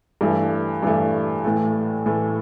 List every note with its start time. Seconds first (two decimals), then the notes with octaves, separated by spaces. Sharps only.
0.21 G2 E3 A3
0.83 G2 E3 A3
1.44 A2 E3 A3
2.06 A2 E3 A3